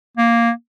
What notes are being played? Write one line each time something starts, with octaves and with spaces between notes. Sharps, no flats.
A#3